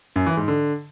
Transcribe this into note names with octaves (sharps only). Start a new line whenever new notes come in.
F#2
E3
G#2
D3